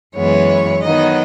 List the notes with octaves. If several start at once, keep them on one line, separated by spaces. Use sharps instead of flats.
F#2 E3 G#3 B3 C#5
D#3 F#3 B3 D#5